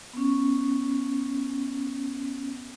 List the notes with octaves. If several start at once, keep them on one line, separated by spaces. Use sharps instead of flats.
B3 C#4